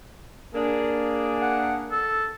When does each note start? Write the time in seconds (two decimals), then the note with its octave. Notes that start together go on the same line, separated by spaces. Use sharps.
0.54 A#3 D4 G#4
1.42 F#5
1.92 A4